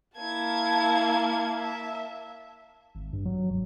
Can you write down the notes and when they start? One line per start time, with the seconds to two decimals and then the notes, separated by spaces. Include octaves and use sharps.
0.18 A#3 E4 A5 G#6
1.57 E5
2.95 G#1
3.13 G2
3.25 F#3
3.50 E1